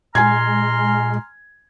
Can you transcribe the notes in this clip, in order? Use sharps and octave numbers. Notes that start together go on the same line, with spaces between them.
A#2 G#3 G#5 A#5 C6 F6 G#6